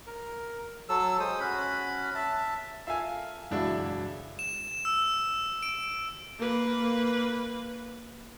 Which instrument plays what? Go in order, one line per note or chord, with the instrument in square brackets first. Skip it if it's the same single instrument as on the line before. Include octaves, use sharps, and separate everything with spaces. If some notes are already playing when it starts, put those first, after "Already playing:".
[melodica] A#4
F#3 A4 E6
G#3 C5 D#6
C#4 F#4 B5
E5 A5
[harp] F4 A4 A#4 [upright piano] E5 F5 G#5
[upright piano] E1 D4 E4 [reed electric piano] F#2 G#3 F#4 [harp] C#3
[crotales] E7
E6
D7
[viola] A#3 B4